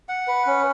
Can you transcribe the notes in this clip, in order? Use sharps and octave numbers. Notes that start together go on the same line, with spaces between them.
F#5
B4
C#4